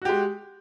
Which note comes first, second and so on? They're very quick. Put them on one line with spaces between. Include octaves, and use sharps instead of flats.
F#4 G4 G#3